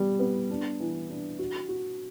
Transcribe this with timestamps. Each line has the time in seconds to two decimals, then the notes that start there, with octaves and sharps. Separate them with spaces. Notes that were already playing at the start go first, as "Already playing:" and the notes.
Already playing: G3 B3
0.20 B3
0.50 D4
0.80 E3
1.09 D4
1.39 F#4
1.69 F#4